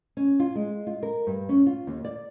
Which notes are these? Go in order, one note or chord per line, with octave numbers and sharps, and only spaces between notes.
C#4
F4
G#3
F4
A#4
G2
C#4
F4
D#2
D5